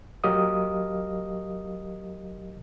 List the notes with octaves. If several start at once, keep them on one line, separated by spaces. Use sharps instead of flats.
F#3 G4 A#4 D#5 F5 D#6